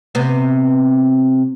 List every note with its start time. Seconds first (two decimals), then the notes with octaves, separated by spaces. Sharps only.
0.15 C3 B3